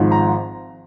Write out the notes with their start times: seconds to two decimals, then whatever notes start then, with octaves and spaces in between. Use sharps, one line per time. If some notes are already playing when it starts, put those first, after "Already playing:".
Already playing: G#1 G#2 F3
0.12 A#5